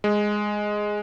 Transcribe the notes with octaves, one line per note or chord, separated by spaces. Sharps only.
G#3